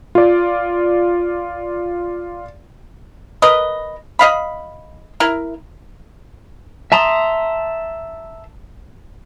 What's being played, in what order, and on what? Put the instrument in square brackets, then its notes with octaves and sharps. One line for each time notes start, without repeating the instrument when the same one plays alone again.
[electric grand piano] F4 D5
[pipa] A#4 B4 D#5
D#5 F5 B5
E4 A#4
[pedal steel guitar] E5 A5 A#5 C6 D#6